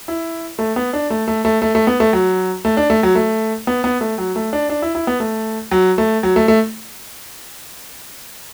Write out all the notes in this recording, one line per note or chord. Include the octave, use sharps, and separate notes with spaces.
E4
A3
B3
D4
A3
A3
A3
A3
A3
B3
A3
F#3
A3
D4
A3
F#3
A3
B3
B3
A3
F#3
A3
D4
D4
E4
E4
B3
A3
F#3
A3
F#3
A3
A3